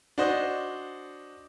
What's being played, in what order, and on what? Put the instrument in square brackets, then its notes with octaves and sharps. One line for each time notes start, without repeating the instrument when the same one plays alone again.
[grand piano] D4 F#4 C5 D#5